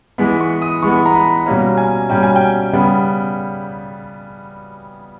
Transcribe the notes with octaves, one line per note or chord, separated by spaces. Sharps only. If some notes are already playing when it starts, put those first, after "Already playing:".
E3 G#3 B3 B5
C#6
D#6
E3 G#3 B3 C#6
A#5
B5
B2 G3 A#3 C#4 A#5
G#5
B2 G3 A#3 C#4 G5
G#5
G5
C#3 G3 B3